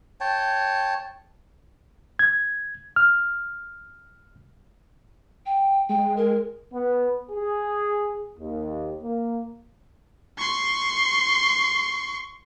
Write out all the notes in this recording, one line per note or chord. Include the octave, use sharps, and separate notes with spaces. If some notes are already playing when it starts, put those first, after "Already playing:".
C#5 G5 A5
G#6
F6
G5
G#3 G5
A#4
B3
G#4
D#2
A#3
C6 C#6